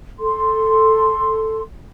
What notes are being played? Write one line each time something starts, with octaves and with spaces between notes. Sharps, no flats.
A4 C6